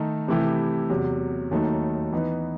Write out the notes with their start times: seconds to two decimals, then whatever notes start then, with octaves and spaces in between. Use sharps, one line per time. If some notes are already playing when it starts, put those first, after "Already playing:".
Already playing: D#3 A3 D#4
0.28 C3 E3 A3 E4 G4
0.90 E2 C3 F#3
1.51 D#2 D#3 F#3 A3 D#4
2.12 E3 B3 D#4